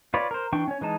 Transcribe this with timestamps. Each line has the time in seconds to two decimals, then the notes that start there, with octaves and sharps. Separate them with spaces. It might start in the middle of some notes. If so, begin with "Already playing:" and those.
0.14 F4 B4 C#5 D5
0.31 A#4 C5
0.53 E3 D4 G5 C#6
0.68 C#4 C#5
0.81 E3 G#3 D#4 A5